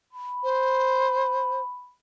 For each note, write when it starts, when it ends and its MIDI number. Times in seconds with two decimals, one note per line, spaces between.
0.13 1.93 83
0.44 1.61 72